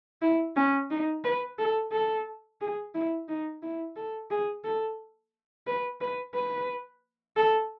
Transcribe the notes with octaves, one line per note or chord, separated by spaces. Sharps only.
E4
C#4
D#4
B4
A4
A4
G#4
E4
D#4
E4
A4
G#4
A4
B4
B4
B4
A4